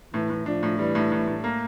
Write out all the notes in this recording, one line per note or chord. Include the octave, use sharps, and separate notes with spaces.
A2 E3
A2
F3 D4
A2
E3 G3
A2
A2
A2
A#3